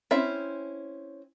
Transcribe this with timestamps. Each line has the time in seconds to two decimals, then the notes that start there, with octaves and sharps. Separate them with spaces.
0.11 C4 C#4 E4 E5